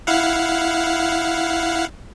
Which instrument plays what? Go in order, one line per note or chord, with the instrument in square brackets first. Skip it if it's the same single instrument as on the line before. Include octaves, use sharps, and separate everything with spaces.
[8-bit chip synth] E4 F5 F#5